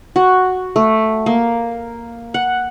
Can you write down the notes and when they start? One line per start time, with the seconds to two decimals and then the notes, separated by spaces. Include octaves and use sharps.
0.16 F#4
0.76 A3
1.26 A#3
2.34 F#5